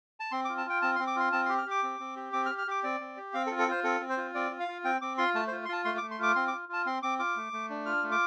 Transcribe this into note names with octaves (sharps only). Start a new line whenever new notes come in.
A5
C4 C6
D6
F4
A5
F4 G5
C4 A5
C6
C4
D6
F4 C6
C4 A5
G4 C6
F6
G4 D6
C4
C4
G4
C4 D6
F6
G4
F6
G4 D6
C4 D5
C4
G4
C4 F5
A4
F4
A4
F4 C5
C4 A4
C4
C5
F4
C4 D5
F4
F5
F4
C4 G5
C4 D6
F4 C6
A3 A5
C5
F4
C6
F4 A5
A3 C6
D6
A3
C6
F4 D6
C4 C6
D6
F4
F4 A5
C4 C6
C4 D6
F4 D6
A3
A3
D4
F4 F6
A3
D6